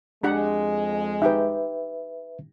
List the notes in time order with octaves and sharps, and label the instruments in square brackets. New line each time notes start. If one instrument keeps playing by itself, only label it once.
[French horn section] F2 G#3 [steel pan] D4 G4 F#5
[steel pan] D#4 G4 G5 [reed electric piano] B4 E5